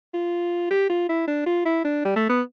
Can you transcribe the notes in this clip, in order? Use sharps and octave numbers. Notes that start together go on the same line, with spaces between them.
F4
G4
F4
E4
D4
F4
E4
D4
G3
A3
B3